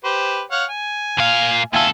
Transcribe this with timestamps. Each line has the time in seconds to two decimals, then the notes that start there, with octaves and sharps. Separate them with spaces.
0.04 G4 B4 C5
0.51 C#5 F5 F#5
0.70 G#5
1.18 A#2 F5
1.73 D#2 F4 A4 E5 G#5